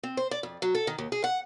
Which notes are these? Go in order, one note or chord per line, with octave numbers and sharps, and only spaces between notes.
C4
C5
D5
F2
F#3
A4
D#3
D#2
G#4
F#5